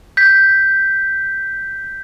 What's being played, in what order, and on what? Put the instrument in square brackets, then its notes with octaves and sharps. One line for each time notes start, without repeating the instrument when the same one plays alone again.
[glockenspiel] G6 B6